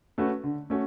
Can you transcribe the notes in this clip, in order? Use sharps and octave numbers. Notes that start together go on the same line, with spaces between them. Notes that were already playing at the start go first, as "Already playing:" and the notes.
A3 C#4 F#4 B4
D3
A3 C#4 F#4